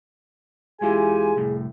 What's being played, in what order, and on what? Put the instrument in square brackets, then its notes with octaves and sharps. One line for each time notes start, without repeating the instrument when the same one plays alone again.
[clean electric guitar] E2 G#3 E4 [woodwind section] F4 G4 G#5 [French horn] G#4
[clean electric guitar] C2 F2 A2